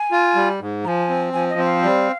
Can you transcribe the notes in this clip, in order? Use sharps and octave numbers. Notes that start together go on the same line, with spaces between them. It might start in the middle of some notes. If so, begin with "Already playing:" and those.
Already playing: G#5
F4
G3
G#2
F3 G#5 A#5
C4
F3 G#5
D#5
C4
F5
G3